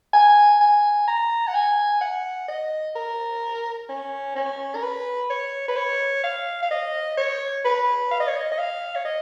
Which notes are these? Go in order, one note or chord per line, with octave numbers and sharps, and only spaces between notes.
G#5
G#5
A#5
F#5
G#5
F#5
D#5
A#4
C#4
C#4
A#4
B4
C#5
B4
C#5
F5
F5
D#5
C#5
B4
F5
D#5
C#5
D#5
D#5
F5
C#5
D#5